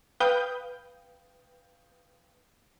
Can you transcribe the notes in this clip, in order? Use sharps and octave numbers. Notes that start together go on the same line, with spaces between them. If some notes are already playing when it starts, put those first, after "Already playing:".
B4 F5 G5 D#6 G6